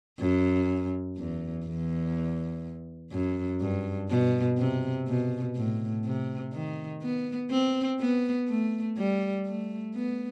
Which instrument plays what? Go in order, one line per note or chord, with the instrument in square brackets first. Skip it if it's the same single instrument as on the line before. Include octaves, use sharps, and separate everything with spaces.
[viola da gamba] F#2
E2
E2
F#2
G2
B2
C3
B2
A2
C3
D#3
B3
C4
B3
A3
G3
A3
B3